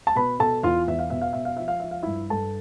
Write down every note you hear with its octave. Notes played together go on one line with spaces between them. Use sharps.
A5
B2 B4 B5
B2 A4 A5
E2 F4 F5
E2 E5
F5
B2 E5
F5
B2 E5
F5
F3 E5
F5
F3 E5
F5
G2 E4 E5
G2 A4 A5